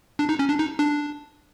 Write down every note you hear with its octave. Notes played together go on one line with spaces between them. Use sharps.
D4
D#4
C#4
D4
D#4
D4